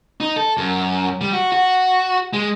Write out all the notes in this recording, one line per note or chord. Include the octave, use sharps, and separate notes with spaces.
D#4
A4
F#2
G3
F#4
F#4
G#3